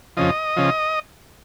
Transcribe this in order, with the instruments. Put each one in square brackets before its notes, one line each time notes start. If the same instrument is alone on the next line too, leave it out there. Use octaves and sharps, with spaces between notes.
[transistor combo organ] F2 C#3 F3 D#5
C#3 F3